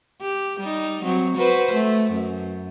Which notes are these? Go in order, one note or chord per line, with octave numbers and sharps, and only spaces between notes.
G4
G3 D#4
F#3 C4
F#4 B4 C5
A3
F#2